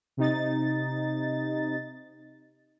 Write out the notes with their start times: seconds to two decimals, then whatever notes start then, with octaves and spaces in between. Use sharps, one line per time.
0.17 C3 D#4 A6